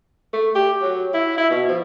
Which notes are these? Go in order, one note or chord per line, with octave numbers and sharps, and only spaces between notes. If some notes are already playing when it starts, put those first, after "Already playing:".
A3
G4
F#3
E4
E4
B2
F3